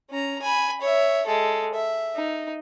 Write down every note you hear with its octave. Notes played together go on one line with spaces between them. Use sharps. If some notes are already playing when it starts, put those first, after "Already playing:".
C#4 A#5
G#5 B5
C#5 E5
G#3 A4
E5
D#4